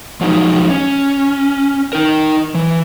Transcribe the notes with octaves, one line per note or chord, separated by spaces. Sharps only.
F3 F#3 G#3 D#4
C#4
D#4 A#4
E3